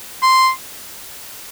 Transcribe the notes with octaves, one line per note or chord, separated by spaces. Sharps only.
C6